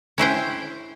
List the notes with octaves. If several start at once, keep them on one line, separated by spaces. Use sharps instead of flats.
C#4 E4 C5 G5